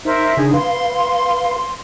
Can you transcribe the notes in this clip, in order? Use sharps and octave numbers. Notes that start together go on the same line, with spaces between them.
D#4 A#4 C5 E5
C#3 D4 D#4 G#4
B4 F5 C6